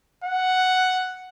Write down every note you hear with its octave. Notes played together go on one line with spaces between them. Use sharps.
F#5